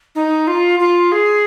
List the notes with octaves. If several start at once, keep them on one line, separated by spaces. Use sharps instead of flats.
D#4
F4
F4
G#4